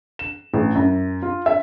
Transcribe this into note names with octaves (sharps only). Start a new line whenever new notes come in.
E7
A1
F#2
F4
E5